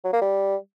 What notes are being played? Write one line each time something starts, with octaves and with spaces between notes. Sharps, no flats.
F#3
A#3
G3